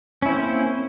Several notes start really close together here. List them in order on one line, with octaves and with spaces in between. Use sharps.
C#4 E4 C4 A#3 C5